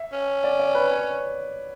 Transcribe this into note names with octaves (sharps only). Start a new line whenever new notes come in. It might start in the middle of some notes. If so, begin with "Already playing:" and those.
Already playing: E5
C#4
D5
D5
B4
C#5